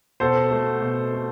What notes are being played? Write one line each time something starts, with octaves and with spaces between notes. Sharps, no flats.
B2 A4 C5
A3
B2
A3